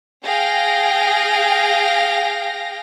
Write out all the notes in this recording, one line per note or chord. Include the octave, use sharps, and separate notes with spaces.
G#4 F5 G5 A#6